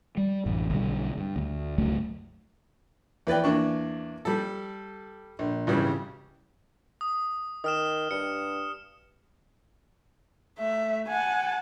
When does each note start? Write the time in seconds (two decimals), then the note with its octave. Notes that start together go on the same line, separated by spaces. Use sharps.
0.17 G3
0.46 A1 F#2
0.70 B1 D3 G3
1.18 G2
1.36 D2
1.78 C#2 G2 F#3 A3
3.27 E2 B4 D5 G5
3.44 E2 A#3 D4 C#6
4.25 G3 A4
5.39 A#1
5.67 G#1 C#3 E3 G3
7.01 D#6
7.64 D#3 D#6 F6 E7
8.11 G2 C#7
10.59 A3 E5
11.08 F#5 G#5 A5